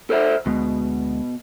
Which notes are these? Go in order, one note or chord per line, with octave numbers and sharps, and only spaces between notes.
A4 C5 E5
D2 B2 G#3